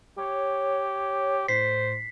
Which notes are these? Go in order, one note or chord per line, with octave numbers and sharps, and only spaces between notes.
G4 C#5
A2 C5 B6 C7